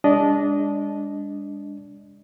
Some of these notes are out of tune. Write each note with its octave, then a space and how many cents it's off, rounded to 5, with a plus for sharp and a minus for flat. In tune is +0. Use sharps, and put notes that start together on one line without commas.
G#3 -40 D4 -20 D#5 +0